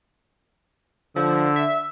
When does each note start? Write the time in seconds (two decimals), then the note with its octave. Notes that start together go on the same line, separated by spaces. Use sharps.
1.16 D3 F3 E6
1.56 E5